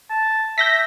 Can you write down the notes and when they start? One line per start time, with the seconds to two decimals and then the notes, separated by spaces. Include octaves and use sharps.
0.10 A5
0.58 E5 G6 A#6 B6